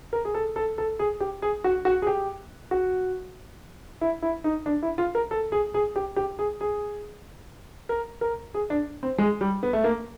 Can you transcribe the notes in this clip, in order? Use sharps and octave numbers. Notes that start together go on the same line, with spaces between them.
A#4
G#4
A4
A4
A4
G#4
G4
G#4
F#4
F#4
G#4
G4
F#4
E4
E4
D#4
D4
E4
F4
A#4
A4
G#4
G#4
G4
G4
G#4
G#4
A#4
A#4
G#4
D4
C4
G#3
G3
B3
A3
A#3